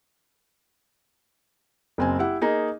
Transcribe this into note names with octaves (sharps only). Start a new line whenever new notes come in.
F#1 C4 G#5
E4 G4 F#5
A#3 D#4 G#4